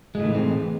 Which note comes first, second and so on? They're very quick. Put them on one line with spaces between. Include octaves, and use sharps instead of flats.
G#3 A2 D#3 E3 C4